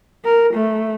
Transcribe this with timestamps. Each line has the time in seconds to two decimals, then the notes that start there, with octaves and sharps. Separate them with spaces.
0.24 A#4
0.54 A3